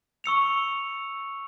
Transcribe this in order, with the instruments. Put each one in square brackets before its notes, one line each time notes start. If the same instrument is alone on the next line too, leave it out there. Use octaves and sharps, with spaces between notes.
[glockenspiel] C#6 E6 C#7 F7